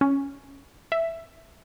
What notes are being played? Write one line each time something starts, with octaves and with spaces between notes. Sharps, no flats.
C#4
E5